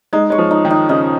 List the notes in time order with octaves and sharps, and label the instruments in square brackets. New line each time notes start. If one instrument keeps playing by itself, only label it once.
[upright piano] G#3 [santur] D#4
[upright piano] G#3 [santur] C#5
[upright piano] F3
[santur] D#4
[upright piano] D#3
[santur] D#4
[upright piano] C#3 [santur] D#4